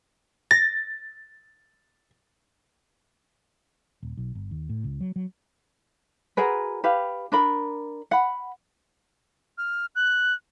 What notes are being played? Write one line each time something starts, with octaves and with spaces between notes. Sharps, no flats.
A6 A#6
D#1
B1
G1
D#2
A2
C#2
F#3
F#3
F#4 G#4 A#4 B4
G4 B4 F5
D4 A#4 B5
F#5 B5
F6
F#6